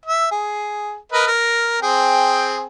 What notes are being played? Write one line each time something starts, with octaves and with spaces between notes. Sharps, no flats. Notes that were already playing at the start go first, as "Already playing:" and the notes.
E5
G#4
A#4 B4 D#5
A#4
C4 G#4 G5